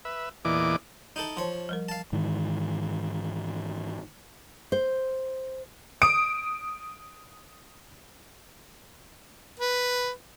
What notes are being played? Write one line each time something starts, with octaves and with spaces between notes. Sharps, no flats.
B4 E5
E2 A#2 E3 D5 D#5 D6
D#4 E4 A4 G6
F3 C#5 A5 C6
F3 G3 A#4
F5 A5
G#2 D#3 E3
C5
D#6 D7
B4